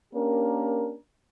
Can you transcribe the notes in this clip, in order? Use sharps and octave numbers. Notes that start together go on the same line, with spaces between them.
A#3 C#4 D4 G4 A#4